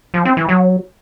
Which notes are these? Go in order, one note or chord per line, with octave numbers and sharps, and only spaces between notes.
F3
C4
E3
F#3